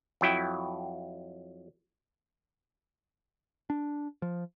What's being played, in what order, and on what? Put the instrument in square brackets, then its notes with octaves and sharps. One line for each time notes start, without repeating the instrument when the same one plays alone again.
[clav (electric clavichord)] F2 F#3 E4 G5
[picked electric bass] D4
F3